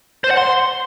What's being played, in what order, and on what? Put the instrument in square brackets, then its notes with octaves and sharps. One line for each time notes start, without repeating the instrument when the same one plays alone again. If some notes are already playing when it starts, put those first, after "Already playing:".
[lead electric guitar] C5
F#5
C6